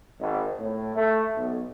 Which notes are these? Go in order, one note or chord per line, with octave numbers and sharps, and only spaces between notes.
G#1
A2
A3
B1